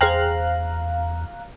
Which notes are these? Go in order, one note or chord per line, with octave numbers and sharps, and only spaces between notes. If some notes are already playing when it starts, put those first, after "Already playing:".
E2 G#4 C5 F5 G5 A#5 F#6